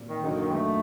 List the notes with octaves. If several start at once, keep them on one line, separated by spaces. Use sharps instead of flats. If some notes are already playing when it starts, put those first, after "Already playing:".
Already playing: A#2 G3 C4
D#3
F#2 D3 F#3 A#3 D#4
D#3
A3